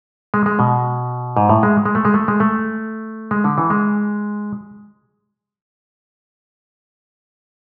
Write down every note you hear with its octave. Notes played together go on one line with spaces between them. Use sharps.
G#3
G#3
B2
G#2
A2
G#3
G#3
A3
G#3
A3
G#3
A3
G#3
D3
E3
G#3